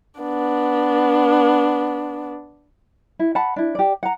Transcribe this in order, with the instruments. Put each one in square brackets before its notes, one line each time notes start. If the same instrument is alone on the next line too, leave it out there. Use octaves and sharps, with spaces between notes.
[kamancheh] B3 D4
[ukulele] E4
F#5 A5 B5
D4 E4
G4 D5
F#5 A#5